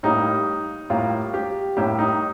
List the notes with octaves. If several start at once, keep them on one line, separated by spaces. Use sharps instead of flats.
A2 G3 A#3 D#4
A2 G3 A#3 F4
G4
A2 G3 A#3 G4
D#4